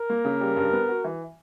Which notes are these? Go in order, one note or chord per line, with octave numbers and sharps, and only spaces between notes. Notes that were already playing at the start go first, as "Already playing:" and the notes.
Already playing: A#4
A#3
C#3
G3
G2
B3
F#4
E3